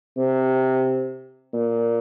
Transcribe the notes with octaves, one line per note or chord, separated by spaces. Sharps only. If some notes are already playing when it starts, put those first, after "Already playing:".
C3
A#2